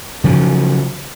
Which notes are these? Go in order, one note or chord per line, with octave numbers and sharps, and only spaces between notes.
C#3 F3 F#3